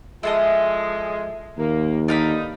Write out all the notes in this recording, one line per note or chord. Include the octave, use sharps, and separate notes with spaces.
F3 G#3 E4 A4 D#5
D#2 A#3
D3 D#4 D5 F5 B5